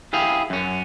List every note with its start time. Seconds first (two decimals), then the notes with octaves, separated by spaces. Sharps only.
0.13 E4 G4 G#4 F5
0.50 F#2 C#4